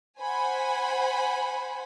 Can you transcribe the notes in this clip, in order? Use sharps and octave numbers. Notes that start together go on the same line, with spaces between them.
C5 F#5 G#5 B5